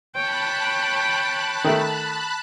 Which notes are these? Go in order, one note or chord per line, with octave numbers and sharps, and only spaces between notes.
C#5 G5 A5 B5 F#6
D#3 A3